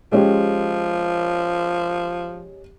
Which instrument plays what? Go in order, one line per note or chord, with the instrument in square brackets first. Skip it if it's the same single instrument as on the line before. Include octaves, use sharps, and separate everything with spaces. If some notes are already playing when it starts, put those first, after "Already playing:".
[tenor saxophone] F3 [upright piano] G#3 C#4 G4